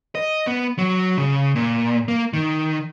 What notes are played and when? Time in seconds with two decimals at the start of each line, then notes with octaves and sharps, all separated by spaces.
0.15 D#5
0.47 B3
0.78 F#3
1.18 C#3
1.55 A#2
2.08 A#3
2.33 D#3